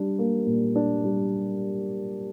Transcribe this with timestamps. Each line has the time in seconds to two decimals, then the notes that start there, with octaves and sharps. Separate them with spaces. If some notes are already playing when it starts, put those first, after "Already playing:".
Already playing: G3 D4
0.19 A#3
0.47 A#2
0.76 D4
1.04 G3